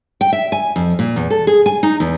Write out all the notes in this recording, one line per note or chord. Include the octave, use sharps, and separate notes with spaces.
G5
E5
G#5
F2
A#2
E2
A4
G#4
G#5
D#4
E2